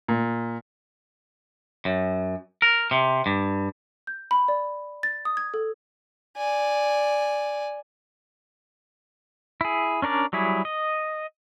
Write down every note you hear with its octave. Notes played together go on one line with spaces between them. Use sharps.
A#2
F#2
A#4
C3
G2
G6
B5
D5
A6
D#6
G#6
A4
D5 G#5
E4 G#4
C#4 D4 A#4 D5
F#3 G3 E4 G#4
D#5